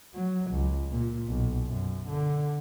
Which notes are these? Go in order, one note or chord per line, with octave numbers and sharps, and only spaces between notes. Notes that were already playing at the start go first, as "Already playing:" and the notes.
F#3
C#2
A#2
B1
F#2
D3